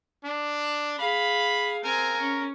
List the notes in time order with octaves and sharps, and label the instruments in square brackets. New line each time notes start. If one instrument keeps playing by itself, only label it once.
[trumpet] D4
[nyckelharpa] G#4 F5 [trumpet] B5
[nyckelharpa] C4 G#5 [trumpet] A#4
[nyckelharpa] C#4